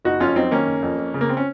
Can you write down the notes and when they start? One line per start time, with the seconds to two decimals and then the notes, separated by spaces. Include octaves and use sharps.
0.05 F#1 D#4 F#4
0.20 F2 C#4 F4
0.36 F#3 C4 D#4
0.51 D#3 A#3 C#4
0.67 F#1
0.83 F2
0.98 F2
1.14 C#3
1.21 A#3
1.29 C4
1.37 C#4